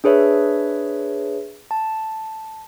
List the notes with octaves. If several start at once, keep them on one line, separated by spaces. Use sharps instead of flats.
D4 G#4 B4 C#5 E5
A5